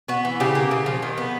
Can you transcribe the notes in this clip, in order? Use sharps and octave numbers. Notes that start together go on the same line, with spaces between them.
B3 F#4
E3
C#3 G4
A#3
C#3
F3
D#3
B3